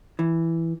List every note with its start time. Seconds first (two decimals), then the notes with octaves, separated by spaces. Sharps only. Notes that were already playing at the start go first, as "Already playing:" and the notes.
0.19 E3